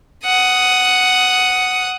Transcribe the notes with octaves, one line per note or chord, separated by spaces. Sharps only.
F#5 D#6